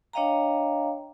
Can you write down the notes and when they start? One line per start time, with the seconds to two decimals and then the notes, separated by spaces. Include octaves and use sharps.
0.13 D4 C#5 D#5 F5 G5 A#5